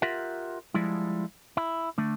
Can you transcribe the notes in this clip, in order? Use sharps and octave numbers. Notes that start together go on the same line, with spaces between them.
F4 G4 A#4 E5 F#5
F3 G3 G#3 E4
E4
D3 A3